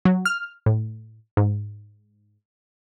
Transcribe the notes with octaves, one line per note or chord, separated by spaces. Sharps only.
F#3
F6
A2
G#2